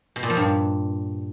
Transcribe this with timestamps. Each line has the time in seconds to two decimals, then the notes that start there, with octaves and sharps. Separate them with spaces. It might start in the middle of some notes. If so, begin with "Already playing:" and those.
0.16 B2
0.23 A#2
0.30 F3
0.37 G2